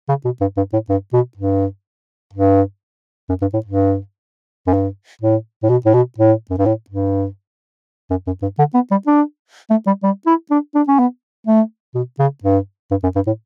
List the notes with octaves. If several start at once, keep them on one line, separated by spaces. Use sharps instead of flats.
C#3
B2
G2
G2
A2
G2
B2
G2
G2
F#2
G2
A2
G2
F#2
G2
A2
A2
B2
A2
B2
A2
F#2
G2
A2
G2
F#2
F#2
G2
D3
B3
G3
D4
A3
G3
G3
E4
D4
D4
C#4
B3
A3
B2
C#3
G2
G2
F#2
G2
A2